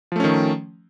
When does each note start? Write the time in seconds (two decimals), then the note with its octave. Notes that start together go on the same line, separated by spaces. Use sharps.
0.12 F3
0.16 A3
0.20 C#4
0.24 D#3